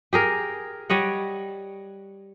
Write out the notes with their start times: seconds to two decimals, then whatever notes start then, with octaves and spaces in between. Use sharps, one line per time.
0.13 G4 G#4 A#4
0.89 G3 C#5 D#5 F#5